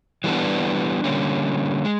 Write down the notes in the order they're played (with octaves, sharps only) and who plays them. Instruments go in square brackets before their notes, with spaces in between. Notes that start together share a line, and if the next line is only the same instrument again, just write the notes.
[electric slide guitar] E3 G3 B3 D4
D3 G3 A#3 C#4
G#3